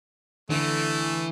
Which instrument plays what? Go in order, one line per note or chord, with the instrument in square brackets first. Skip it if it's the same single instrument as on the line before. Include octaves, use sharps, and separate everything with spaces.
[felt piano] D3 D7 [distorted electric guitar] E3 [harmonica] A3